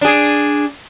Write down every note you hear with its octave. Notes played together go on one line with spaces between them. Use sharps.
D4 G#4